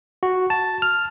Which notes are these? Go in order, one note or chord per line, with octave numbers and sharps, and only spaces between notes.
F#4
A5
F6